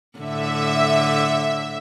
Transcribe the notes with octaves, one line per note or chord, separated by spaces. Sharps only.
A2 D3 E5